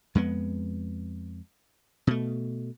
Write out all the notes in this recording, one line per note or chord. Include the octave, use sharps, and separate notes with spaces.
F2 G#3 B3
B2 A3